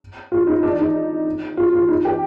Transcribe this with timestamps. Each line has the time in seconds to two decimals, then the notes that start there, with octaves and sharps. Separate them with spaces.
0.32 F4
0.47 D#4
0.63 D4
0.79 D#4
1.57 F4
1.73 F4
1.89 D#4
2.05 G4